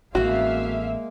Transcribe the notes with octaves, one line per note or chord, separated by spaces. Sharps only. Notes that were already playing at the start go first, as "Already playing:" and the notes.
A1 G#3 A#3 C4 F#4 E5 F5